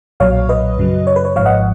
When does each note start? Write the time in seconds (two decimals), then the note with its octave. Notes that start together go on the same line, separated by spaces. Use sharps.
0.20 B1 A#2 F#3 C#5 F5
0.49 B4 D#5
0.78 F#2 C#3 F#3
1.07 C#5
1.16 B4
1.25 C#5
1.36 G#1 G#2 F3 C#5 F5
1.46 D#5 F#5